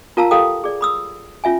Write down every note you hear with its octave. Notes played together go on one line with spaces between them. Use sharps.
F4 A#4 F5 A5 A#5 E6
G4 A4 A#4 F5 G5 D#6
G#4 D5
B5 D#6 E6
C#4 F4 E5 G#5